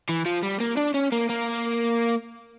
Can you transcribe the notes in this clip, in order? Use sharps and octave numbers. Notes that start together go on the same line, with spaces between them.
E3
F3
G3
A#3
D4
C#4
A#3
A#3